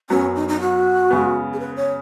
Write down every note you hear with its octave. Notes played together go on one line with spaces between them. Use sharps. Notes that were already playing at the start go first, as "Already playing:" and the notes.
F#2 F#3 B3 C#4 F#4
D#4
D#4
F#4
C#3 G#3 B3
G#4
B4
C#5